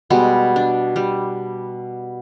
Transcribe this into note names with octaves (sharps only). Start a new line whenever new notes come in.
B2 G3 G#3 F#4
D4
G3